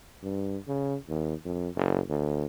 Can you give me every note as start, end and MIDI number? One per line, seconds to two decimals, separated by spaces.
0.23 0.57 43
0.68 0.96 49
1.09 1.34 39
1.45 1.69 41
1.75 2.00 30
2.09 2.46 38